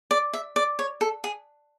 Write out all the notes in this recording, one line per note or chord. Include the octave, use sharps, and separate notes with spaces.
D5
E5
D5
C#5
A4
G#4